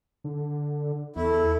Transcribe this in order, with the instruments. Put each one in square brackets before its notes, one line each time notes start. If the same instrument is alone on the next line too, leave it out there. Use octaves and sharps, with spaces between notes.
[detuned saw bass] D3
[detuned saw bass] E2 [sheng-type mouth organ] E4 [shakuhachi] A4